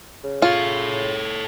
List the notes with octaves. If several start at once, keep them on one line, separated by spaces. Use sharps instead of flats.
C#3
F4 A4 C#5